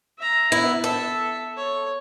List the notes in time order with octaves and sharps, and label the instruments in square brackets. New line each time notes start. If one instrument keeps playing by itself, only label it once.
[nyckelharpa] E5 A#5
[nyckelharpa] B3 [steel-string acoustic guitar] E4
[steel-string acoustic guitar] A4 [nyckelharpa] E5
[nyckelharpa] C#5